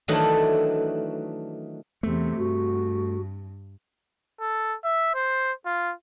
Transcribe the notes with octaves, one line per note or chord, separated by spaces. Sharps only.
D#3 E3 F#3 A3 D4 D#4
E2 C3 A3
G2 F#4
A4
E5
C5
F4